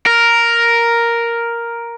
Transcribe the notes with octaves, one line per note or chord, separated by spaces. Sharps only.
A#4